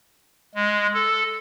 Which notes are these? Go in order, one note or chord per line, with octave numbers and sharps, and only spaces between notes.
G#3
A4